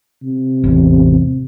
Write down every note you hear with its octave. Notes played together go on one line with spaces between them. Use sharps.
C3
A1 E2